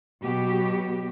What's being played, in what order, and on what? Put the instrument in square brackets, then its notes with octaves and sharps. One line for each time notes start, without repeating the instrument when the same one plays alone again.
[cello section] B2 F#3 B3 F#4 G4